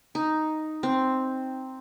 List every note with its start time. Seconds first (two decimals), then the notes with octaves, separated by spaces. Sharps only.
0.15 D#4
0.83 C4